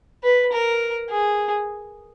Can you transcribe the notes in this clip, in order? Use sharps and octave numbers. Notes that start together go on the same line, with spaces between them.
B4
A#4
G#4